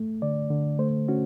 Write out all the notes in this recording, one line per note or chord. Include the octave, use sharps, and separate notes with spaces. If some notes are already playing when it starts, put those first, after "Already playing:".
Already playing: A3
D3 D5
D3
A3 C5
C#4 F#4